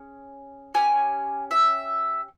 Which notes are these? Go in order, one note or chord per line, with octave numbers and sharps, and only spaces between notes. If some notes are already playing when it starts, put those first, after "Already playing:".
Already playing: C#4 G#4
C#4 G4 G#5
E5